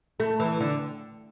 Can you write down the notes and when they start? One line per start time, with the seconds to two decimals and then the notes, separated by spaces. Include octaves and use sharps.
0.20 A3
0.40 E3
0.60 D3